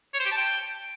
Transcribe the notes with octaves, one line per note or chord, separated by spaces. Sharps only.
C#5
C5
G4
A5
G5